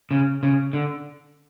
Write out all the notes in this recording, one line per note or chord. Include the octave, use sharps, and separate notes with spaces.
C#3
C#3
D3